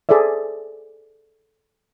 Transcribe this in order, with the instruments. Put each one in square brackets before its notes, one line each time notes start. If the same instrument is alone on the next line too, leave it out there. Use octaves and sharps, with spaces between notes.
[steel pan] G#4 A4 C5 D5 E5